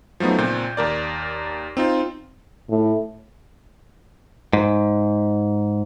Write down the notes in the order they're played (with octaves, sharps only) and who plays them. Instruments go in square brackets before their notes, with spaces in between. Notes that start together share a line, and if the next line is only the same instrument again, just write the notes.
[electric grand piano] F3 F#3 A3 B3 D#4
C#2 A#2 C4 G6
D#2 A#4 D5
C4 D#4 F4
[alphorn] A2
[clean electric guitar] G#2